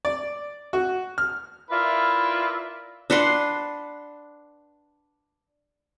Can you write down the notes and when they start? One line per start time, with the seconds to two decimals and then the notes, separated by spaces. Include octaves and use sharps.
0.05 D5
0.73 F#4
1.18 F6
1.70 E4 F4 A#4 B4 D5 E5
3.10 D4 B4 F#5 C6